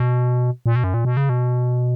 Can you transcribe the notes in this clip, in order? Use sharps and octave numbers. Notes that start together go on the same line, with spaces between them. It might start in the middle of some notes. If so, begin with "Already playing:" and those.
Already playing: B2
A#2
B2
F#2
A#2
B2
C#3
B2